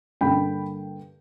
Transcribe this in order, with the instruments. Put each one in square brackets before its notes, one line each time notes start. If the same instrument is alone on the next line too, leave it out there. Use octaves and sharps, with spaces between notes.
[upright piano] G2 D3 G3 A#3 D4 G5 B5